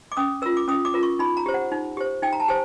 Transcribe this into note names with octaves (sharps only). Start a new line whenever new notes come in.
D6
C#4 D#6
F4 A#4 E6
D6
C#4 D#6
D6
F4 A#4
C#6
D#4 B5
A#5
G4 C5
F#5
D#4
G4 C5
D#4 G5
A#5
A5
G4 C5 G#5